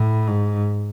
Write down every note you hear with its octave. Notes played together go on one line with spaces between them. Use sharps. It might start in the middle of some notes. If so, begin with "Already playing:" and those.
Already playing: A2
G#2